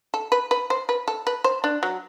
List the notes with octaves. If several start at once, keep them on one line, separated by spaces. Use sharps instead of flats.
A4
B4
B4
C5
B4
A4
B4
C5
D4
F#3